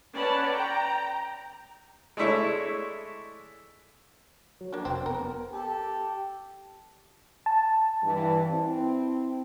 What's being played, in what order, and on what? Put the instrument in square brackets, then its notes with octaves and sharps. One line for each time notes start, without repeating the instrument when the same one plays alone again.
[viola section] C#4 B4 D5 F#5 A5
G5 A#5
[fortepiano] G#3 A3 D4 E4 C#5 E5
[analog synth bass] F#3
[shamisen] A#3 D4
[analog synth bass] F1 [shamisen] C4
[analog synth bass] B3 [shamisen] A#4
[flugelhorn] G4 [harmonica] A4 A5
[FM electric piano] A5
[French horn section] G2 E3
C4 E4